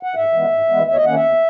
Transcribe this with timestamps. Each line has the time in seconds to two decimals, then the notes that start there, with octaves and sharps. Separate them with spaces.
0.03 F#5
0.15 G#2 E5
0.33 E3 G#3 B3
0.51 G#2
0.69 E3 G#3 B3
0.87 E2 E5
0.93 C#5
0.96 D#5
1.05 D#3 A#3 C#4 F#5
1.15 E5
1.24 E2